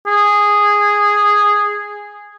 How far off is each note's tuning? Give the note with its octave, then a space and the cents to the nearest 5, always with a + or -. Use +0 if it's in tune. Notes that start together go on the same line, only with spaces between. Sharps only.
G#4 -10